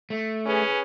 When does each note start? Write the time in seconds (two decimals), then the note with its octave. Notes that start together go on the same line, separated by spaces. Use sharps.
0.10 A3
0.46 C#4 G#4 B4